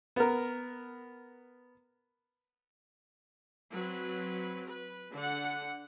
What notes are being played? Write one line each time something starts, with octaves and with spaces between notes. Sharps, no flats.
B3 A#4
F#3 C4 B4
B4
D3 F#5